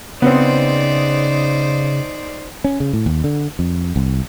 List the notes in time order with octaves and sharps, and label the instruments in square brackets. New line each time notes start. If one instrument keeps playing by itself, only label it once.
[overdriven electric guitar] C#3 [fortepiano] B3 C4 [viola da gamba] D#4 C5 D5
[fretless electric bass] C#4
C#3
A2
D#2
D3
F2
C2